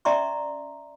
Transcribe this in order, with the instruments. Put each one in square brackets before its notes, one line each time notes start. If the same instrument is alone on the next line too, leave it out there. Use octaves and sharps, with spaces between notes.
[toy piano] C#4 D5 E5 A#5 C6 C#6